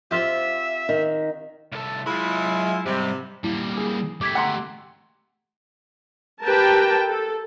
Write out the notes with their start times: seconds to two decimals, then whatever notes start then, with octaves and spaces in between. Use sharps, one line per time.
0.11 C4 F4 G4 E5
0.89 D#3
1.72 C2 A4
2.07 F#3 G#3 E4 F4 B5
2.86 G#2 C3 G3
3.44 G3 A#3 E4
3.77 G#4
4.21 A3 G4 D6 G#6 B6
4.35 F#5 A#5 C6
6.42 G4 A#4 B4 G5 A5
7.07 A4